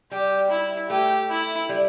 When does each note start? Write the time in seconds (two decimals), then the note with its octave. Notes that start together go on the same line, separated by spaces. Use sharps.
0.11 G3 G4
0.50 E4
0.90 A3 G4
1.30 E4
1.69 G3